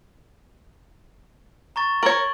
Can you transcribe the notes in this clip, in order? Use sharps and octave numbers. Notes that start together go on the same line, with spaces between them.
A#5 C#6 A6
A#4 C#5 C#6 D7 F#7